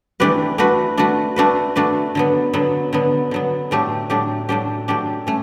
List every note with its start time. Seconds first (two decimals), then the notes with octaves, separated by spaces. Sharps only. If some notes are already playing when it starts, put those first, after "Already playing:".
0.20 E3 A3 D4 G4 B4
0.58 A3 D4 F#4 B4
0.97 A3 D4 F#4 B4
1.36 A3 D4 F#4 B4
1.76 A3 D4 F#4 B4
2.15 D3 F#3 B3
2.54 D3 F#3 B3
2.93 D3 F#3 B3
3.31 D3 F#3 B3
3.71 A2 F#3 A3 D4 G4
4.10 A2 F#3 A3 D4 G4
4.49 A2 F#3 A3 D4 G4
4.88 A2 F#3 A3 D4 G4
5.27 A3 C#4